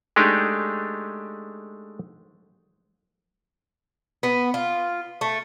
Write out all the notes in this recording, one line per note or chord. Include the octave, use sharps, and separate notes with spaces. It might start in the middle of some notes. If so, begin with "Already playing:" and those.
G#3 A3 D4 D#4 G4
B3
F4
A3